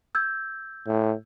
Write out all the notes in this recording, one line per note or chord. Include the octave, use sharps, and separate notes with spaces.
E6 G6 G#6
A2